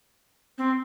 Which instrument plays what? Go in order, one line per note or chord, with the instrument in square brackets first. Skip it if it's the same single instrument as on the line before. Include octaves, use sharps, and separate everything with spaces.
[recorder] C4